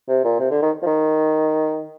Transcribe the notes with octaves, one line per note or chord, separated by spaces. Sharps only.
C3
A#2
C3
D3
D#3
F3
D#3